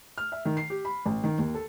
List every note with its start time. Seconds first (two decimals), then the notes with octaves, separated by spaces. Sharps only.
0.18 F6
0.32 E5
0.45 D#3
0.57 C7
0.70 G4
0.85 B5
1.06 A1
1.24 D#3
1.38 D#2
1.55 A4